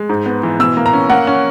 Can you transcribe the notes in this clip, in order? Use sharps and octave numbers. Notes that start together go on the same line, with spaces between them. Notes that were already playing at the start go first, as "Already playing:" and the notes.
Already playing: G#3
G#2
B3
E3
B2 E6
A#3
A#5
C#4
A#3 F#5
C#4